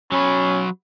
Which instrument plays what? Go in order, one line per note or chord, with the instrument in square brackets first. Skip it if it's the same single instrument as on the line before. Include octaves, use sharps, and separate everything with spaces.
[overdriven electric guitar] F#3 B4 [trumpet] C#4